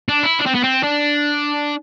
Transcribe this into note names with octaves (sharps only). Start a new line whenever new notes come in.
D4
E4
D4
C4
B3
C4
D4